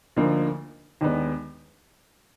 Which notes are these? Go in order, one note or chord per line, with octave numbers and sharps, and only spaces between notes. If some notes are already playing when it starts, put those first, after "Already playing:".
D2 D3 F3 A#3 D#4
D#2 D#3 G#3 B3 D4